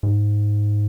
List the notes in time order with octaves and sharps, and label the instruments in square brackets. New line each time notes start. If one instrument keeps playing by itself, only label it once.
[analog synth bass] G#2